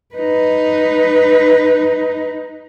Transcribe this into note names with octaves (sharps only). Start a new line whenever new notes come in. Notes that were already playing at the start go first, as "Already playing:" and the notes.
D#4 B4